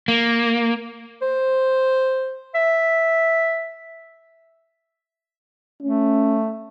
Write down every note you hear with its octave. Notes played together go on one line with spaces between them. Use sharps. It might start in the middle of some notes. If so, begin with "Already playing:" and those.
A#3
C5
E5
A3 C#4